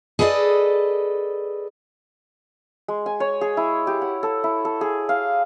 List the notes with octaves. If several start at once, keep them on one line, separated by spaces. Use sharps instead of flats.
G#4 A4 B4 D5 D#5
G#3
G#5
C#5
G#4
E4
G4
F#5
A4
E4
A4
G#4
F5